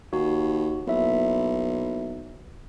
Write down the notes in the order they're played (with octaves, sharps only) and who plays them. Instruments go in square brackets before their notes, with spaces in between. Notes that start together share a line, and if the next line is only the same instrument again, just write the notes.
[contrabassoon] D#2 [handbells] F#4
[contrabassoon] B1 [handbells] A#3 E4 E5